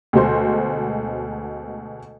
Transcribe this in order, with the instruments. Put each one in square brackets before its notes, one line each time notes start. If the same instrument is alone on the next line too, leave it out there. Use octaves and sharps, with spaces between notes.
[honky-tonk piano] D2 B2 G#3 F#4 C5 C6